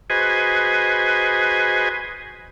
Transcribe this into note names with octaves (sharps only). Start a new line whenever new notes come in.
F#4 G#4 B4 C5 D#5 G#5